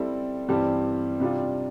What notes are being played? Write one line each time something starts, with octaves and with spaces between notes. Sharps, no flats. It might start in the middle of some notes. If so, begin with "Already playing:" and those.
Already playing: G3 C4 E4 A4
G2 E3 G3 C4 G4
C3 G3 D4 F4